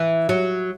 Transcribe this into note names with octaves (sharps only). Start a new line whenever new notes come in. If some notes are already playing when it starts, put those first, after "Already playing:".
Already playing: E3
F#3